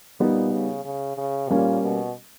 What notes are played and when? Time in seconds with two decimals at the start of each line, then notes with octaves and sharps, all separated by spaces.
0.20 A#2 G3 B3 D#4
0.52 C#3
0.85 C#3
1.17 C#3
1.50 A#2 G3 A#3 C#4
1.83 B2